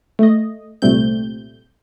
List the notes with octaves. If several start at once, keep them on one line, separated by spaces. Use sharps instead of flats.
A3 D#5
C2 A#2 G3 A3 C4 G6